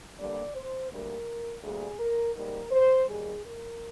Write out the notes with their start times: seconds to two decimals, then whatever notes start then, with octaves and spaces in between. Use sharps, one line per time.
0.19 G2 D3 G3 A#3 D5
0.55 C5
0.91 D2 D3 G3 A#3 A#4
1.63 D2 D3 G3 A#3 G#4
1.99 A#4
2.35 G#2 G3 A#3 A#4
2.71 C5
3.08 D#2 D#3 G3 G#4
3.44 A#4